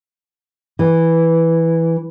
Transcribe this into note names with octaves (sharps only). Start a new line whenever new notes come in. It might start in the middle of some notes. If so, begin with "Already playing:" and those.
E3